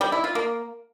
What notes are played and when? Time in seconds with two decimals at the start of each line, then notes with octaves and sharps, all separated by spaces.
0.01 G3
0.12 E4
0.24 F4
0.35 A#3